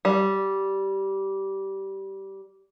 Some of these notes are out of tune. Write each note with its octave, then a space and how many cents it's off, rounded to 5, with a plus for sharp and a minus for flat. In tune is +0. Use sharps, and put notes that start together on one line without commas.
G3 -15